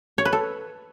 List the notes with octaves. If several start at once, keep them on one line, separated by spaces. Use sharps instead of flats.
C#5
B4
A4